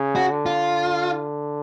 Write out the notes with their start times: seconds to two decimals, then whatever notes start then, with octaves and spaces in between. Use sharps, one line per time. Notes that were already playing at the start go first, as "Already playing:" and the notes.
Already playing: C#3
0.16 F#4
0.31 D3
0.46 F4